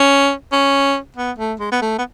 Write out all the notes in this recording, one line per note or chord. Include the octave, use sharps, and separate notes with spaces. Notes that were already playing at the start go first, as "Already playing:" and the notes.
Already playing: C#4
C#4
B3
A3
G#3
B3
A3
B3